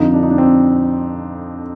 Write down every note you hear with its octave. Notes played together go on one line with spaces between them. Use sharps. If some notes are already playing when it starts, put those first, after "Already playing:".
Already playing: F2 D3 F3 D#4
D4
D#4
D4
C4